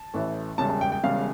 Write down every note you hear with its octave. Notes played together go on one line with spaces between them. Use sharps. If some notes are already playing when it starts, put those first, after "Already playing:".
Already playing: A5
A1 A2 E3
E1 E2 C#3 G3 A5
A5
G5
G5
E1 E2 C#3 G3 F5